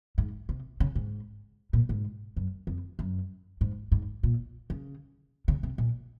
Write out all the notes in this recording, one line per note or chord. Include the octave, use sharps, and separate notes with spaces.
G#2
C3
C#3
G#2
A#2
G#2
F#2
F2
F#2
G#2
G#2
A#2
C#3
C#3
C3
A#2